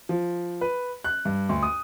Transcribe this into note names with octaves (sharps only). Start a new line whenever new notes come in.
F3
B4
F#6
G2
D2
D#6